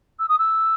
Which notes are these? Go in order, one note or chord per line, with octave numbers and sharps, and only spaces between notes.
E6
D#6
E6